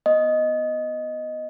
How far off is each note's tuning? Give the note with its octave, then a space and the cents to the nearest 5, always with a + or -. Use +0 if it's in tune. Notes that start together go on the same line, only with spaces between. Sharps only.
B3 +0 D#5 +0